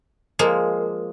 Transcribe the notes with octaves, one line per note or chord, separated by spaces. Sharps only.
F3 G#3 A#3